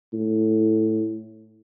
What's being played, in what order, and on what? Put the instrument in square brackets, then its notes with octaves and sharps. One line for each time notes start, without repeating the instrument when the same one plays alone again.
[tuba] A2